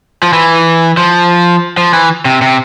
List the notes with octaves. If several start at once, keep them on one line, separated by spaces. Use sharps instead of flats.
F3
E3
F3
F3
E3
C3
C3